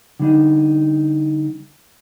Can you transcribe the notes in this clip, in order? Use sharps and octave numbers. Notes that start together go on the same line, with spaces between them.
D3 G3 D4 D#4